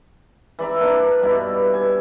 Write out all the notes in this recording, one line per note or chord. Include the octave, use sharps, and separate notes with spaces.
E3 D5 E5 A#5
A#3 D4 D5
G2 B2 E4
G#5